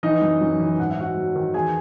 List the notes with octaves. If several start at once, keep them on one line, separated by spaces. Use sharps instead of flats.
E3 D#4 D#5
F#2
F#2
E3
G#2 F#5
E5
G#2 F#4 F#5
F#3
D#3
E2 G#4 G#5